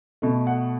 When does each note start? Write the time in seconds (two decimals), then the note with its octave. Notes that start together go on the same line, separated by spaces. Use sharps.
0.22 B2 A3
0.47 F#5